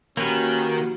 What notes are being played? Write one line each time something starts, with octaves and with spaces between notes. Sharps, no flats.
D#3 A#3 C#4 F#4 G4 B4